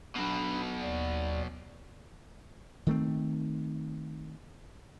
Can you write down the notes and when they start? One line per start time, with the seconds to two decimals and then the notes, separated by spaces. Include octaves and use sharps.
0.15 B1 B2 D4 B5
0.80 D#2 D5
2.87 D#3 A3 C4